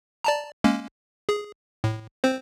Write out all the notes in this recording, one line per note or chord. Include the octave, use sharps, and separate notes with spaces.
D5 A5 A#5
G#3 A#3 C#4
G#4
A2
C4 C5